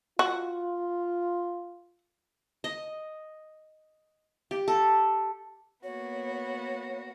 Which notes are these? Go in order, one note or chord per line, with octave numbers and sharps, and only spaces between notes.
F4 F#4
D#5
G4
A4
A#3 B3 F#4 C#5